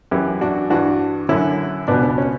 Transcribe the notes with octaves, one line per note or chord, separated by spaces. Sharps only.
F#2 E3 E4 G4
D4 F#4
G2 E3 D4 F#4
F#2 D3 C#4 E4
C#2 B2 B3 D4
B3
C#4